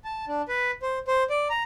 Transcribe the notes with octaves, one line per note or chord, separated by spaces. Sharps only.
A5
D4
B4
C5
C5
D5
A#5